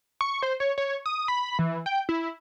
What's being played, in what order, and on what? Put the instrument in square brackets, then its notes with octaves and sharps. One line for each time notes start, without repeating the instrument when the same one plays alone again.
[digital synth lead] C#6
C5
C#5
C#5
D#6
B5
E3
G5
E4